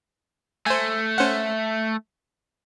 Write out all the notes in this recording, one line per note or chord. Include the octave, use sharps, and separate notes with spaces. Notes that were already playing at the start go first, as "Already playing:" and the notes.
A3 C5 G#5
C#4 C5 F#5